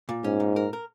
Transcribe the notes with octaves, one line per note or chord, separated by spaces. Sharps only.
A#2
G#2 C#4
A#2
A#4
A#4